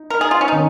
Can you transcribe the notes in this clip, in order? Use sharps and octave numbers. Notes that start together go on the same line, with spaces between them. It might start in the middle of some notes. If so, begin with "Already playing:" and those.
Already playing: D#4
A#4
G#4
F4
C#4
D#4
D#3 C#4